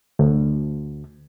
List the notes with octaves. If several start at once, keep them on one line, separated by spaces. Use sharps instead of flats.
D2